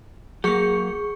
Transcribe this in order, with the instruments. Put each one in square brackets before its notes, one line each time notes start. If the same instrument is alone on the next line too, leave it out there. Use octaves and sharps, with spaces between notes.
[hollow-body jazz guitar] F#3 A#3 [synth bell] G#4 C#6 C#7